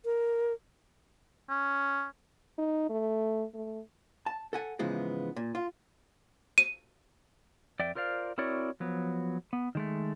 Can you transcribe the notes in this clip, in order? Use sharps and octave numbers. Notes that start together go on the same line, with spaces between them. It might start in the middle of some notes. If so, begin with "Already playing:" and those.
A#4
C#4
D#4
A3
A3
A5
A4 F#5 G#5
G#2 C#3 E3 F3 G#3 B3
A#2
F4
D#7
F2 D5 E5 G5
F4 A#4 C5 D5 F5
C4 E4 F#4 A#4 C#5 D5
F3 F#3 B3
B3
D#3 G#3 A3